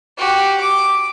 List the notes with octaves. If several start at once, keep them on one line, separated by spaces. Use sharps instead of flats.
F#4 G4
D6